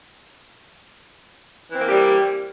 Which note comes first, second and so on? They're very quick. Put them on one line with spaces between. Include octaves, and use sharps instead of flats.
E3 C4 A#3 G4 G3